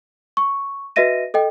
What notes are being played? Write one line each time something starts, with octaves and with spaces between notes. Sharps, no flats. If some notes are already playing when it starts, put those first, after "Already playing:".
C#6
F#4 B4 D#5 E5 A#6 D#7
A4 D#5 G5